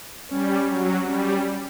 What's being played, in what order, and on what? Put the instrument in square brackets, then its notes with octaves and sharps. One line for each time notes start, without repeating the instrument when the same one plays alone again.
[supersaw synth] G3 [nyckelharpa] C#4
[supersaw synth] F#3
[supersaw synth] G3 [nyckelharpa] C#4